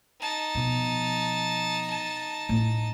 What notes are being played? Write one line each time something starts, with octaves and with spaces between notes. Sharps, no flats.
D#4 A5
B2 F3
A2 C#4